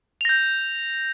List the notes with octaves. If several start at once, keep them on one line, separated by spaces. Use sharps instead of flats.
G6 A#6 F7